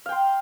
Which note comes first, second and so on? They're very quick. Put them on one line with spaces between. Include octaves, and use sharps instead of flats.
F5 G5 C6